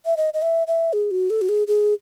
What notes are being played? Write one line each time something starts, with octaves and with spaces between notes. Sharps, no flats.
E5
D#5
D#5
E5
E5
G#4
F#4
A4
F#4
G#4
G#4